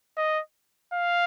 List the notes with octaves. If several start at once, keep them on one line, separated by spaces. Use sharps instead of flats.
D#5
F5